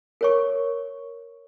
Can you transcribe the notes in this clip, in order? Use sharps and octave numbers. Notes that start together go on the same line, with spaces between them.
A#4 C#5 C#6